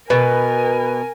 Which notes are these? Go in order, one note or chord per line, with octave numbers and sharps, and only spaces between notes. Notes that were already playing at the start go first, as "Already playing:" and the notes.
B2 A#4 B4 G#5